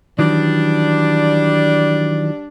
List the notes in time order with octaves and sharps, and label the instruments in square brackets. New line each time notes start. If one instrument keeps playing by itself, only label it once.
[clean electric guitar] D#3 E3 F#3 [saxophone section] G3 D4